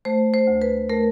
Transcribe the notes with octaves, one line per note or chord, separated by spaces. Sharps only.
A3 C5
C5
D2
B4
A3 A#4